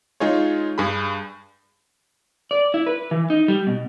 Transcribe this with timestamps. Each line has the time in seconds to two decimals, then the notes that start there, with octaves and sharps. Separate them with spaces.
0.20 G#3 D#4 F4 G#4 C#5
0.78 G2 G#4 B5
2.51 D5
2.74 E4
2.86 B4
3.11 E3
3.30 D#4
3.48 G3
3.67 B2